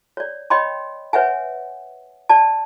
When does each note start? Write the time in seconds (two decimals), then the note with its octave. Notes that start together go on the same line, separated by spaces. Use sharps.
0.17 C#5 D5
0.50 C#5 D#5 G5 B5 C6
1.13 B4 C#5 E5 F#5 G#5
2.29 D5 A5